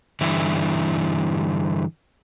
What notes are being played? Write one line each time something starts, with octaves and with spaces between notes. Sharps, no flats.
G2 D3 E3 E4